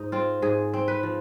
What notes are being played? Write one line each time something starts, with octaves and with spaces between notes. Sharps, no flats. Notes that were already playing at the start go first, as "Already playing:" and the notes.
Already playing: G#2 D#4
C4 F4
G#2 G#4
C4
B4
F3